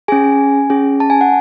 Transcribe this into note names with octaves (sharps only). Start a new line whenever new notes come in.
C#4 G#4 G#5
C#4 G#4
A5
G#5
F#5